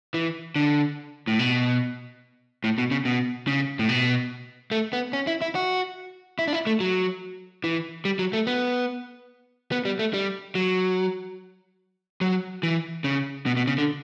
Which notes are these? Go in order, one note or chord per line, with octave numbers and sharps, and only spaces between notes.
E3
D3
A2
B2
A2
B2
C#3
B2
C#3
A2
B2
A3
B3
C#4
E4
E4
F#4
E4
D4
E4
A3
F#3
E3
G3
F#3
A3
B3
B3
G3
A3
G3
F#3
F#3
E3
C#3
B2
B2
C#3
D3